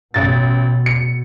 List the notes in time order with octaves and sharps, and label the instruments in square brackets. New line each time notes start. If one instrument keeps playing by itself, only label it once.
[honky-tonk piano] A1 A6 [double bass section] B2
[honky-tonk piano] C#7